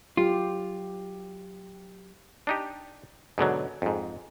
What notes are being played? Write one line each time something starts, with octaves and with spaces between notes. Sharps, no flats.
F#3 F4 G4
D4 D#4 G4
G#2 B2 D3 F#3
F2 G#2